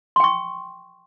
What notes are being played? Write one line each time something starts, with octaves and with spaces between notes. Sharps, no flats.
G5 C6 C#6